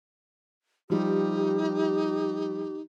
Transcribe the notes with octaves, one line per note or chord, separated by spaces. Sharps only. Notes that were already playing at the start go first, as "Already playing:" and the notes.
F3 G3 D#4 G4